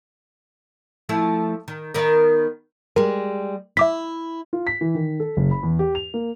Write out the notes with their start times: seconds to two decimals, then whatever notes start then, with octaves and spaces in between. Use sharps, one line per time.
1.09 F3 A3 E4
1.68 D#3
1.94 D#3 B3 A#4
2.96 G3 G#3 A#4
3.77 E4 E5 D6 B6
4.53 F4
4.67 B6
4.81 E3
4.95 D#3
5.20 A4
5.37 F#1
5.51 B5
5.63 E2
5.79 G4
5.95 F7
6.14 A#3